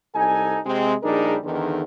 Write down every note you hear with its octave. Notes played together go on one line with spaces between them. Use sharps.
C2 D#4 A4 G#5
C3 G#3 C4
A#1 G3 D4 D#4 G#4 A#4
E2 D3 D#3